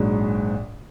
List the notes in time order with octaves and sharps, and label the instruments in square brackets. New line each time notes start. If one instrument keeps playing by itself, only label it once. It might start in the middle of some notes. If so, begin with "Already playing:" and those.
Already playing: [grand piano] A#1 G#2 F#3